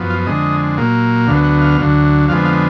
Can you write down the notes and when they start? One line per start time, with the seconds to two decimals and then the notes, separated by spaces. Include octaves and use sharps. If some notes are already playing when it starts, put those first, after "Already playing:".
Already playing: F#2 F3 B3
0.10 F4
0.26 F2 D3 G#3 D#5
0.77 A#2 F#3 A#3
1.27 D2 D3 F#3 B3 F5
1.44 F#5
1.61 F5
1.78 D2 D3 F#3
2.28 F2 D3 F3 G#3 B3 F5
2.45 F5